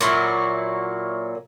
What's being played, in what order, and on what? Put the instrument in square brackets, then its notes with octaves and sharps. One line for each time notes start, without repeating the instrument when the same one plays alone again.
[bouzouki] A#2 F#3 E4